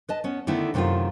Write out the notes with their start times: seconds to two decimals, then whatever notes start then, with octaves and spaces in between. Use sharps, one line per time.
0.09 B4 D#5 A5
0.24 B3 C#4
0.47 D3 D#3 A3 B3 E4
0.74 F#2 C3 D#3 G#3 A3 F4